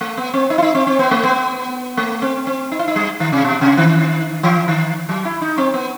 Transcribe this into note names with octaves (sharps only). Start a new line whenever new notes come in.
A3
B3
C4
D#4
E4
D#4
C4
C4
B3
A3
B3
A3
C4
C4
D#4
E4
D#4
G3
D#3
C3
B2
C3
D#3
E3
D#3
F#3
E4
D#4
C4
B3